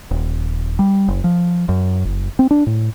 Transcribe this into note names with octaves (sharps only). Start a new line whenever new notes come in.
D#1
G3
F#1
F3
F#2
F#1
C4
D4
A2